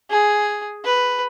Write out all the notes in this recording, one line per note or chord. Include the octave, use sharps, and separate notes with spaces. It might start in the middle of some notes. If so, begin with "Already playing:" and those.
G#4
B4